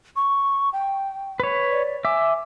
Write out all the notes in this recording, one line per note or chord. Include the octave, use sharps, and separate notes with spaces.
C#6
G5
B4 C#5
D5
E5 G#5 D6